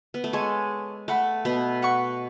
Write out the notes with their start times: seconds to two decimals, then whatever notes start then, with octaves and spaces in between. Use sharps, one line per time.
0.14 B3
0.24 A3
0.33 G#3 A4 C#5 G#5
1.08 A3 B4 F#5 B5
1.45 B2 B3
1.82 B4 F#5 C#6